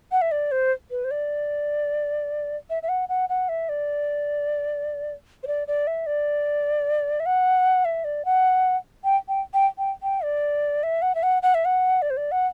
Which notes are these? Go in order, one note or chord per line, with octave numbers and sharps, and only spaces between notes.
F#5
E5
D5
C5
B4
C5
D5
E5
E5
F#5
F#5
F#5
E5
D5
C5
D5
D5
E5
D5
E5
F#5
E5
D5
F#5
G5
G5
G5
G5
G5
D5
E5
F#5
E5
F#5
F#5
E5
F#5
D5
C5
D5
F#5